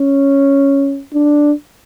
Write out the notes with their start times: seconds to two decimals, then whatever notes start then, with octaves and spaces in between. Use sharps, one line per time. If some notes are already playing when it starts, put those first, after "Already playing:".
Already playing: C#4
1.14 D4